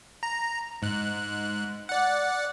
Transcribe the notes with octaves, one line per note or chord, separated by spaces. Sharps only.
A#5
G#2 F#6
D5 F#5